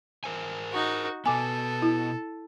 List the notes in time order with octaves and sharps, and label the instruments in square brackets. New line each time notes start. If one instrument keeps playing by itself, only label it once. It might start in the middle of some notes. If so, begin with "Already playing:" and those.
[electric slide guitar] A#4 C5 G#5
[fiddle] D#4 F#4
[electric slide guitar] B2 B3 [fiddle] A4 [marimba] G#5 D6
[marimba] E4